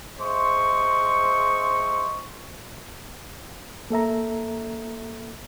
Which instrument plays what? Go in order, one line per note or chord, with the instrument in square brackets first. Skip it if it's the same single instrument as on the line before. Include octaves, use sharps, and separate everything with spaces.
[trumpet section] G#4 C5 D#5 E5 C6 C#6
[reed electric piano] A#3 A4 E5 A#5